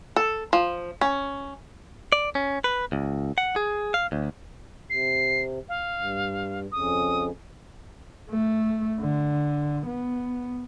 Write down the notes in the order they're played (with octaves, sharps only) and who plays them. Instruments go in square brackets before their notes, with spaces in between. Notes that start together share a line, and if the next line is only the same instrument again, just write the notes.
[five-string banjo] A4
F3
C#4
[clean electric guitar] D5
C#4
B4
C#2
F#5
G#4
F5
D2
[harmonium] C3 [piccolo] C7
[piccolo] F5
[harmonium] G2
[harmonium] F2 C#3 [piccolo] D#6
[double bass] A3
D3
B3